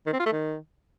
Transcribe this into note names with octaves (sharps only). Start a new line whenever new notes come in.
D#3
C4
F4
A3
D#3